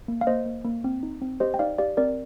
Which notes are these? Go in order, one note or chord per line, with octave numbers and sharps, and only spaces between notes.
A#3
F5
A#3 C5 D#5
A#3
A#3
C4
D#4
C4
G4 C5 D#5
G5
D#4 D5 F5
G4 D5 F5
C4 A#4 D5